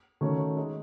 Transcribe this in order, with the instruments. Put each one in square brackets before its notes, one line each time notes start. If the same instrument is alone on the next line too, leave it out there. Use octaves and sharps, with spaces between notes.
[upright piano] D#3 A3 C#4 F#4 C#5
G#3 D#4 G#4 D#5